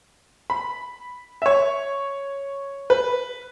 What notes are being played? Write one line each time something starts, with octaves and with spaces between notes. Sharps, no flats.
B5
E5
C#5
B4